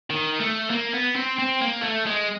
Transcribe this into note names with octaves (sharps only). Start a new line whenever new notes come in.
D#3
A3
A#3
B3
C4
C4
A#3
A3
G#3